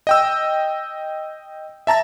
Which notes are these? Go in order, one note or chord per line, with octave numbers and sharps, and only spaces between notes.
D#5 G5 E6
E5 A5 A#5 A6